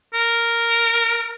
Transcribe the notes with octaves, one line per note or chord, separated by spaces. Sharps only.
A#4